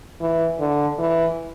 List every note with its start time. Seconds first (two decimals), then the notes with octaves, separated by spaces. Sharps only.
0.20 E3
0.60 D3
0.99 E3